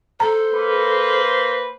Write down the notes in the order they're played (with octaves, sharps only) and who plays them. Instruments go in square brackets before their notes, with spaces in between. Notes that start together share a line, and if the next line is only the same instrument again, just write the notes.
[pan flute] A4 [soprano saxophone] C5 [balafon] A#5
[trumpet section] A#3 B4